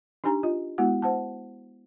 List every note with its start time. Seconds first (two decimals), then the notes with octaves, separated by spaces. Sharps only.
0.24 D4 D#4 G4 G#5 A#5
0.43 F4 D#5
0.78 G#3 B3 E4 F#4 F#5
1.02 C5 F#5 A5